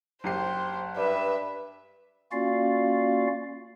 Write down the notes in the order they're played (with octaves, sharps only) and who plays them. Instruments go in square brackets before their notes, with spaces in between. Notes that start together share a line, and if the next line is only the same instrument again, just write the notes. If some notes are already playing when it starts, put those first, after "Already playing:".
[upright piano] F#1 G4 C7 [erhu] C5
[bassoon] G2 [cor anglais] B4 [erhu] E5
[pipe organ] A#3 C#4 F4 F#4 D5 F5